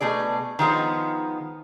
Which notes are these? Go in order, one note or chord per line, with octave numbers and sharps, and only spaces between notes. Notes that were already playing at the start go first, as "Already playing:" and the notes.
B2 A3 G#4 D5
D#3 F3 G#3 B3